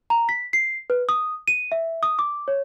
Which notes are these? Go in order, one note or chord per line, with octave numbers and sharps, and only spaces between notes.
A#5
B6
C7
B4
D#6
D#7
E5
D#6
D6
C#5